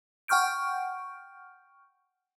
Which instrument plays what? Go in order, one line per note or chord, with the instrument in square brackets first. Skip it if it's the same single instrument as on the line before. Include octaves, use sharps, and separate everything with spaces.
[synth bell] F#5 G5 C#6 F6 G6 D7